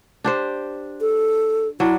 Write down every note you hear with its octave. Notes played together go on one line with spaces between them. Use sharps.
D4 G4 C5
A4
F#3 D4 E4